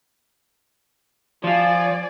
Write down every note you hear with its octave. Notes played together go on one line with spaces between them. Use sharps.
F3 F4 D5 G#5